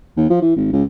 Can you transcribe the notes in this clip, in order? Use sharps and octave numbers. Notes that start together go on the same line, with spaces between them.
D#2
F3
E3
G#1
C#2